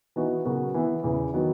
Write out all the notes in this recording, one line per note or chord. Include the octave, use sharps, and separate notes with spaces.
E3 B3 D#4 F#4 B4
C#3 F#3 B3 F#4 A#4
E3 B3 E4
E2 C#3 E3
D#3 F#3 B3